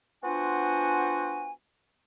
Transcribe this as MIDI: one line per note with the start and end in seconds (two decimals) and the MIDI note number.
0.23 1.51 59
0.23 1.51 62
0.23 1.51 65
0.23 1.51 66
0.23 1.51 72
0.23 1.51 80